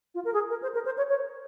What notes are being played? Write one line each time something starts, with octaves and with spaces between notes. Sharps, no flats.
F4
A#4
G#4
A#4
C5
A#4
C5
C#5
C#5